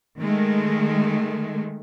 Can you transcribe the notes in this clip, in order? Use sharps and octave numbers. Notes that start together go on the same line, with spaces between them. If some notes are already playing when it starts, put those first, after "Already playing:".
D#3 G#3 A3